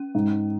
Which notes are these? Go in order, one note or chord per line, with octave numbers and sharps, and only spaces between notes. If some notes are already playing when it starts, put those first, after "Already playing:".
Already playing: C#4
G#2